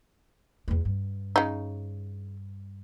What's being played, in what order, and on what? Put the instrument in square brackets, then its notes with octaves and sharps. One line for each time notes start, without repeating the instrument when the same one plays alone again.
[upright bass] E2 B3
G2
[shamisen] C#3 D#4